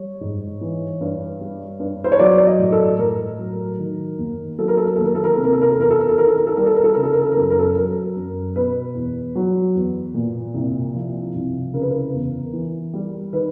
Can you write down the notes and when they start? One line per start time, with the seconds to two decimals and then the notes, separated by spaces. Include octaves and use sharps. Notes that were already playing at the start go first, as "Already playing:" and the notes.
Already playing: G3 C#5
0.21 G#2
0.61 E3
1.01 G2
1.40 G3
1.80 G2
2.04 C5
2.12 C#5
2.19 F#3 D5
2.40 D5
2.47 D#5
2.59 A2
2.72 A4
2.99 A2 A#4
3.39 F#3
3.79 D#3
4.19 D#2
4.58 F#3 A4
4.68 A#4
4.77 A4
4.87 A#4
4.95 D#2 A4
5.06 A#4
5.15 A4
5.24 A#4
5.33 C3 A4
5.43 A#4
5.53 A4
5.61 A#4
5.72 A4
5.77 E2 A#4
5.90 A4
6.00 A#4
6.09 A4
6.17 D#3 A#4
6.28 A4
6.38 A#4
6.47 A4
6.56 G3 A#4
6.66 A4
6.75 A#4
6.84 A4
6.94 C#3 A#4
7.03 A4
7.13 A#4
7.21 A4
7.32 A#4
7.37 F#2 A4
7.50 A#4
7.59 A4
7.76 F#3 A#4
8.16 F#2
8.55 B2 B4
8.95 E2
9.35 F#3
9.75 E2
10.14 A#2
10.54 C2
10.94 F3
11.34 C2
11.73 C#3 A#4
11.81 B4
11.90 A#4
12.13 E2
12.53 E3
12.93 G3
13.33 D#3 B4